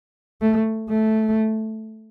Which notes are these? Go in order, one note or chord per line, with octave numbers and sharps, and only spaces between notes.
A3
A3